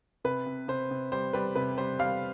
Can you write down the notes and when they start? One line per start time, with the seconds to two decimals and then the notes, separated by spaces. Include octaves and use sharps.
0.24 C3 B4
0.46 C3
0.68 C3 C5
0.91 C3
1.12 G3 C5
1.33 G3 B4
1.55 C3 B4
1.78 G3 C5
1.99 G3 F5